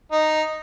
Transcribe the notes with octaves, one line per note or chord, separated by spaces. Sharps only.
D#4